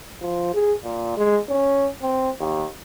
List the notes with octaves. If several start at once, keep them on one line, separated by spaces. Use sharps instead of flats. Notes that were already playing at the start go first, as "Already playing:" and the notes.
F3
G#4
A#2
G#3
C#4
C4
D#2